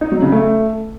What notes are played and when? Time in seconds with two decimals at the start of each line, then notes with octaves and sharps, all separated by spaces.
0.01 D#4
0.12 F#3
0.22 C#3
0.32 A3